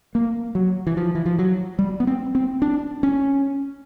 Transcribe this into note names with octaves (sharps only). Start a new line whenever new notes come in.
A#3
F#3
E3
F3
E3
F3
F#3
G3
B3
C4
C4
D4
C#4